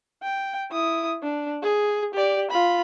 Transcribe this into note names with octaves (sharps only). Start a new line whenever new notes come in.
G5
E4 D#6
D4
G#4
G4 D5
F4 B5